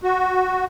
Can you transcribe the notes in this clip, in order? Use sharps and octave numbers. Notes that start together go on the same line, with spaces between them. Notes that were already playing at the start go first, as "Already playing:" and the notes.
F#4